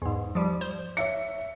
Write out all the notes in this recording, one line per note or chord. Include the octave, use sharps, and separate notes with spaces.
E2 G#2
F3 G3
C5
C#5 E5 C#7